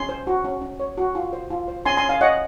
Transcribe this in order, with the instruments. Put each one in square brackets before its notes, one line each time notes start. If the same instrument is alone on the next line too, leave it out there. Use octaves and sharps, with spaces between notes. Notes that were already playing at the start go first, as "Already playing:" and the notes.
Already playing: [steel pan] C#4 G#5 C6
C5
F#4
C#4
C#4
C#5
F#4
F4
C5
F4
C5
C#4 G#5 C6
G#5 C6
C#4
F5 G#5
C#5 D#5 F#5